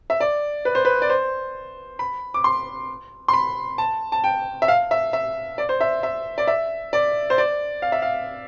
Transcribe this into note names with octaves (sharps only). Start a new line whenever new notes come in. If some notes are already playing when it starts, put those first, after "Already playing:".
E5
D5
B4
C5
B4
D5
C5
B5
D6
C6
C6
B5
A5
A5
G5
E5
F5
E5
E5
D5
C5
E5
E5
D5
E5
D5
C5
D5
F5
E5
F5